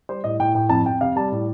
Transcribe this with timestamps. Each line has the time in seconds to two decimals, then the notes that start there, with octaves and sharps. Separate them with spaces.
0.09 G3 C5
0.24 A2 D#5
0.39 A2 G5
0.55 A2 G5
0.69 F2 A5
0.86 F2 G5
1.01 C3 F5
1.16 G3 A5
1.32 A2